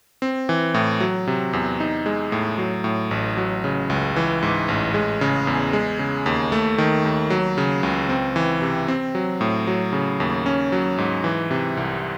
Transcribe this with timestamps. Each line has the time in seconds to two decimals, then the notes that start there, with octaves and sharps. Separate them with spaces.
0.22 C4
0.49 E3
0.74 A2
1.00 F#3
1.27 C3
1.53 E2
1.80 D#4
2.06 G#3
2.32 A2
2.58 F#3
2.84 A2
3.11 A1
3.37 F#3
3.64 C#3
3.90 C#2
4.16 E3
4.43 G#2
4.68 A1
4.94 G#3
5.21 C#3
5.47 E2
5.73 G#3
5.99 C#3
6.26 D#2
6.52 A3
6.78 D#3
7.05 D#2
7.30 F#3
7.58 C#3
7.83 C#2
8.09 C4
8.36 E3
8.62 C3
8.88 C4
9.15 F#3
9.41 A2
9.67 F#3
9.93 C#3
10.20 D#2
10.46 C#4
10.72 F#3
10.98 G#2
11.24 E3
11.51 C3
11.77 C2